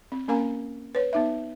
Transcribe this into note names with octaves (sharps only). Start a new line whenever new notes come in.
C4
A#3 C#4 A#4 F5 G#5 A#5
B4 C#5
B3 D#4 E5